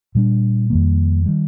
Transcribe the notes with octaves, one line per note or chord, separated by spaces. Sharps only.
A#2 G3 D4
F2 D#3 G3 A#3
D#3 G3